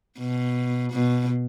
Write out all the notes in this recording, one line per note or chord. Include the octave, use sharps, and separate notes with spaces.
B2
B2